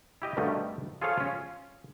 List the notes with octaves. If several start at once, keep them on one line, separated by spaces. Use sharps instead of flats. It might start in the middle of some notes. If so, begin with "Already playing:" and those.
E4 G4 D#5
G2 B2 D3 D#3 G3 A3
F4 G#4 A4 C5 C#5 F5
C#4 F4